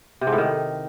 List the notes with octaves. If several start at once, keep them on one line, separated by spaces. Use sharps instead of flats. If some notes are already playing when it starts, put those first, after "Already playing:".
C3
G#2
A2
D#3